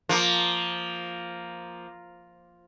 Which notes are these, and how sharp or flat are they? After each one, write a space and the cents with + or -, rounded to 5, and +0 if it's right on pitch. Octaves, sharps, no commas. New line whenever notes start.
F3 +0 A#3 +0